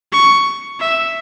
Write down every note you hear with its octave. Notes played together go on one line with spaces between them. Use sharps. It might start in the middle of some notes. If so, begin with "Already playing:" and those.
C#6
E5